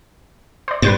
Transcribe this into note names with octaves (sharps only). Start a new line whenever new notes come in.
C5 D5
G2 B4 C5 A6